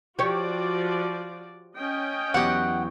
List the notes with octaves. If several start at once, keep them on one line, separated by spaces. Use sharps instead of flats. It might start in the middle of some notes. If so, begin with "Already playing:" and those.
F3 F#4 G4 C#5 D5
C#4 D#5 G5
E2 F#3 G4 F#5